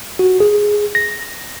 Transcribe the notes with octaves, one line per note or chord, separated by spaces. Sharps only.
F#4
G#4
A#6